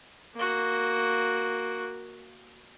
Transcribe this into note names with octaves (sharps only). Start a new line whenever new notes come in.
A#3 F#4